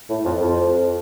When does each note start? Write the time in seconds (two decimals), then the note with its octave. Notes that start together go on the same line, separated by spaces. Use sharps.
0.10 A2
0.25 F2
0.41 F2